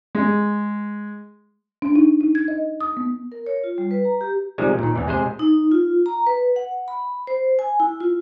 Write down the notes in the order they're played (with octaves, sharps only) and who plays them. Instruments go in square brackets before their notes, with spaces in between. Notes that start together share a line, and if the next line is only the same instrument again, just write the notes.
[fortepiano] G#3
[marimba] D4
D#4
D#4
G#6
D#5
D#6
B3
[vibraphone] A#4
C#5
F4
G3
B4
A#5
G4
[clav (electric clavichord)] C3 D#3 F3 G3 G#3
A#2 D#3
E2 E3
C3 G#3 G#4 C5
[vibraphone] D#4
F4
A#5
B4
F#5
B5
C5
G#5
E4
F4